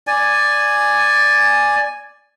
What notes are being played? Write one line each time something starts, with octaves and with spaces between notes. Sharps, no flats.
D5 G#5